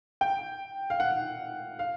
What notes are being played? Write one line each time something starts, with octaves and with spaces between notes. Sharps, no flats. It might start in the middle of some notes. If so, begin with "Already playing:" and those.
G5
F5
F#5
F5